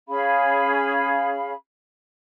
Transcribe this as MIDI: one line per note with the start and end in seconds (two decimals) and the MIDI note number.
0.08 1.52 61
0.08 1.52 68
0.08 1.52 77
0.08 1.52 83